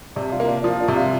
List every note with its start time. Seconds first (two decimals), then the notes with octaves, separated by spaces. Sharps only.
0.16 C3 D4
0.32 F4
0.40 A#3
0.48 D4
0.64 F3 F4
0.80 D4
0.88 C3
0.96 F4